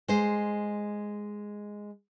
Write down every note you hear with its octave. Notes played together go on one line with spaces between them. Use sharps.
G#3 C5